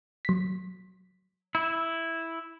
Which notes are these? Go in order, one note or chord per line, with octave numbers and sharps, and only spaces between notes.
F#3 B6
E4